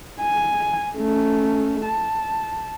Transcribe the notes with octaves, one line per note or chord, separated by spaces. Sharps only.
G#5
A3 C#4
A5